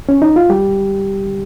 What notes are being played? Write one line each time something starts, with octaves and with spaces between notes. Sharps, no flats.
C#4
D#4
F4
G3 G4